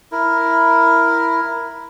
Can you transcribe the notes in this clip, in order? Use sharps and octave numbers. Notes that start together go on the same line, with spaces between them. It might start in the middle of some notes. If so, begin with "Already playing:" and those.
E4 A#4